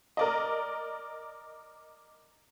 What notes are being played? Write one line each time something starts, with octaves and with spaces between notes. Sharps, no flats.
A#4 D5 D#5